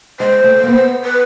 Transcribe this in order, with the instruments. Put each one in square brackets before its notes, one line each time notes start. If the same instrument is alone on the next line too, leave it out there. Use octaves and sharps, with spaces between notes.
[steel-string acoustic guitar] G#3 [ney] C5
[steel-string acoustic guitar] A3
A#3
B3
[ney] B4